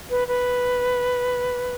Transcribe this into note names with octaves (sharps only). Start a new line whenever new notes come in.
B4
B4